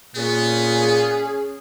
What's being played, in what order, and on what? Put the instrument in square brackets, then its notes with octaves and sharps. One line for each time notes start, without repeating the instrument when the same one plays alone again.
[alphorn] A#2 [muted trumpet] B3 [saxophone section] C#4 G#4